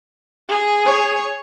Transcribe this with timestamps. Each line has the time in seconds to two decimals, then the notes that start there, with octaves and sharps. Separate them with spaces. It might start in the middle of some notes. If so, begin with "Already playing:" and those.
0.49 G#4
0.85 C#5